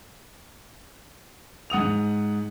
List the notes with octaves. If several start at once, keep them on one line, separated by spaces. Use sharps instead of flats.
G#2 F#5 D#6 F7